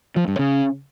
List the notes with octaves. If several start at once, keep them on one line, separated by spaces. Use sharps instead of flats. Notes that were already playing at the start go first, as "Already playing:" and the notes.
F3
G2
C#3